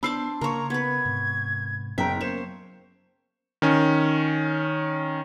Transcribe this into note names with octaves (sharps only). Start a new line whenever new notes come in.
B3 D4 C5 B5 D6 E6 C7
C#3 A#3 A#4 C#5 A#5 C6 C#6
B3 B4 G#6
G#2 C3
F#1 F#3 B3 C#4 E5 G5 A#5
A#3 C5 C#5 E7
D#3 C#4